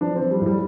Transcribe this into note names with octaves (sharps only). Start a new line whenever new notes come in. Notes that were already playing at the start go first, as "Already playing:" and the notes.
F3 D4
C4
F3
G3
A2
G3